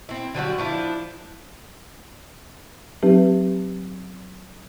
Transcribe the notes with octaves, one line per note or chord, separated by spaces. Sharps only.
C4 E4
D3 F#3 G3 F#4
F3 D4 E4
F#3 C4 D#4 G4 B4